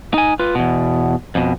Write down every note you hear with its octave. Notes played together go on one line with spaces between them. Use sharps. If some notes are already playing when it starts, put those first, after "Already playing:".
D#4 G#5
F4 B4
E2 B2
F2 B2